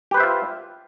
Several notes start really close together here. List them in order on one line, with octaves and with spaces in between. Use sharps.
G4 B4 C5 E5 F4